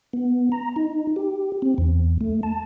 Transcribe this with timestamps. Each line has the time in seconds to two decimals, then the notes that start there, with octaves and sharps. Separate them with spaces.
0.13 B3
0.52 A#5
0.76 D#4
1.16 G4
1.62 C4
1.78 E2
2.21 A3
2.43 A5